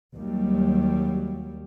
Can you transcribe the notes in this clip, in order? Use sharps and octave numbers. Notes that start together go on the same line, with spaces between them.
D#2 F#3 G3